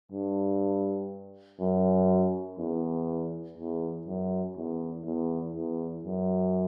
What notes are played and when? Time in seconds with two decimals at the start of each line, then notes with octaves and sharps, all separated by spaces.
0.12 G2
1.60 F#2
2.58 E2
3.57 E2
4.07 F#2
4.57 E2
5.06 E2
5.55 E2
6.05 F#2